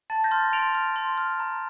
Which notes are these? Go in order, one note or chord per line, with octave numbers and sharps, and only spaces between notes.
A5 A6
G6 A#6
C6 F6
A6
C6 D7 F7
F6
C6
F6
A#5